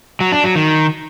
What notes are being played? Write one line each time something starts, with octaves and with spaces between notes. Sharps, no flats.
F#3
D4
F#3
D#3